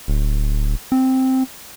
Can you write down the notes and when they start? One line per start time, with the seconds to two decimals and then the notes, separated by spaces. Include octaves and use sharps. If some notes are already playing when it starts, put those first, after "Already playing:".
0.08 D1
0.92 C4